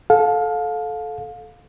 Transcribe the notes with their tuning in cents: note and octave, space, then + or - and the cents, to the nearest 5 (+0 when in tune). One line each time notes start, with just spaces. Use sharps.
A4 -15 F5 +25